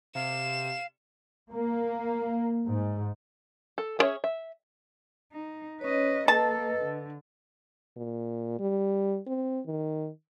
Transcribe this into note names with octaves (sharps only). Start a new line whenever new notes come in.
C3 F5 E7
A#3
G#2
A4
B3 C#4 G#4 C#5 E5
E5
D#4
C#4 B4 C#5 D#5
A#3 A4 B4 D#5 A5
D3
A#2
G3
C4
D#3